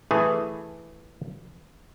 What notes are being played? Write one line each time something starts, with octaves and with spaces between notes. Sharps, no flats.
E3 A3 G#4